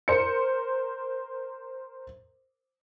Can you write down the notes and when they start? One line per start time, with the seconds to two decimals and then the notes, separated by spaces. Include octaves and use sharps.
0.08 A#4 C5 C#7